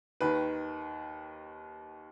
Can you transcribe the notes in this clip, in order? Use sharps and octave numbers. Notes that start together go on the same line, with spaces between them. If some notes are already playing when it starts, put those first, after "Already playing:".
D#2 D#3 B4